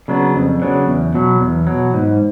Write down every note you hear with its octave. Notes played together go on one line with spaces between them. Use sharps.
C#3 F#3 B3 D4
F2
C#3 F#3 B3 D4
E2
B2 F#3
E2
B2 F#3
G#2